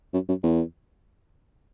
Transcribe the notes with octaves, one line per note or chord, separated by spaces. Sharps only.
F#2
F#2
E2